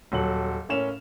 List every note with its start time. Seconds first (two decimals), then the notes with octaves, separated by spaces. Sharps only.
0.12 D#1 F#3 A4 F#7
0.69 A2 A#3 C#4 E7 F7